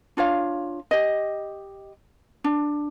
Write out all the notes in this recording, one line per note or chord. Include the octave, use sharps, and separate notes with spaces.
D4 F4 C#5 F5
G4 D#5
D4